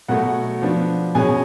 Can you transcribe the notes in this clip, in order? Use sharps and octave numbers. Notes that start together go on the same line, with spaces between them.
B2 F#3 A3 F#4 F#5
F3 B3 D4
B2 F#3 C#4 G#4 G#5